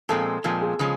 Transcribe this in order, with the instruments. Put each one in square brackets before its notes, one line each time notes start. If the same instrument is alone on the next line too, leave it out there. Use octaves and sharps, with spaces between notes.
[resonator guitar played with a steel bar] A#2 F3 G#3 C4 [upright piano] A4
[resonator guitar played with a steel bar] A#2 F3 G#3 C4
[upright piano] G#4
[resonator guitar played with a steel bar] C#3 F3 G#3